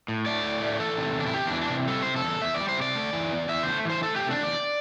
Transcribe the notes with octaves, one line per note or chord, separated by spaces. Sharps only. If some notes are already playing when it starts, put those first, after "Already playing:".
A2
A3 D5
A2
A3
E3 A4
C3
E2 D4
E4
E2 G4
E3 D4
D4
C3
G3 A4
C3 C5
A4
E2
E2 E5
D5
G3
C5
C3 D5
A3
E3
E2
E2 E5
A3 C5
E3 C5
A3 A4
C3 G4
D4
E2 D5